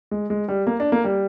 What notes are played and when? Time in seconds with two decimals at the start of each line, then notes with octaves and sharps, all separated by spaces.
0.11 G#3
0.30 G#3
0.48 G3
0.67 A#3
0.80 D4
0.92 A#3
1.04 G3